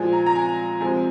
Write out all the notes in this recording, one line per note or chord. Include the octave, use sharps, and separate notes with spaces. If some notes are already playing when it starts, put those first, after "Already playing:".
Already playing: A#2 F3 G#3 G#5
A#5
A#5
G#5
C3 F3 G#3 G#5